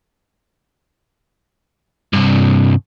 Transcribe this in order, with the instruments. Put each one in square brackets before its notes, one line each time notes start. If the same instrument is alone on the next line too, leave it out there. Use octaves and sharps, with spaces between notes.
[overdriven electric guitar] C2 G2